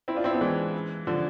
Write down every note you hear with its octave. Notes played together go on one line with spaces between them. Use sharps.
C4 E4
D4 F4
C4 E4
B3 D4
E3 G#3
D3 F3